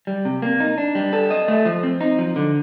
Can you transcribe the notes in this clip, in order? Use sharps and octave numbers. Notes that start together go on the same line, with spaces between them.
G3
C3
A#3
D#4
D4
G3
A4
D#5
A3
F3
C4
D#4
F3
D3